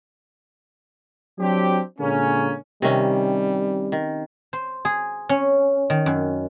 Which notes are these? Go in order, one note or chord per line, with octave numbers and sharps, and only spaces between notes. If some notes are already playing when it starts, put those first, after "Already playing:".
F#3 C4 D4 G4
A#2 D3 G#3 A#3 C#4
C3 D#3 G3 C#4
D#3
C5
G#4
C#4
D#3
F#2